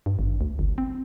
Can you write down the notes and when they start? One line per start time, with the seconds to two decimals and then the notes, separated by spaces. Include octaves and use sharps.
0.06 G2
0.19 G#1
0.41 D2
0.59 G1
0.78 C4